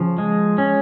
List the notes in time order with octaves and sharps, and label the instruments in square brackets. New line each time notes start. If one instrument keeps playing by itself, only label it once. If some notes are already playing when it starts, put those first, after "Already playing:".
Already playing: [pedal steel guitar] C#3 F3
G#3
C#4